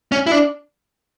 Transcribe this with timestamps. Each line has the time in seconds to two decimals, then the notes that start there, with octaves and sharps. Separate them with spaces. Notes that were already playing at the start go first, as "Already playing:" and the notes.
0.12 C#4
0.27 E4
0.32 D4